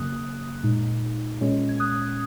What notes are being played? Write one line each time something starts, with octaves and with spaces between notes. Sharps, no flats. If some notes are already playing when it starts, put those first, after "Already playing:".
Already playing: F#2 C#3 F#3 A#3 D#6 F#6
A#2 G#3 D#4
A#2 G#3 C#4
G#6
D#6 F#6